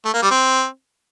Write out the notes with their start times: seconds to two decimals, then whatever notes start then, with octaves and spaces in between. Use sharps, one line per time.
0.05 A3
0.14 A#3
0.22 G3
0.31 C4